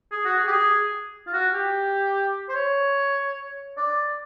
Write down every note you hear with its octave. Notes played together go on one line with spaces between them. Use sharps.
G#4
F#4
G#4
G4
G#4
F4
F#4
G4
C5
C#5
D5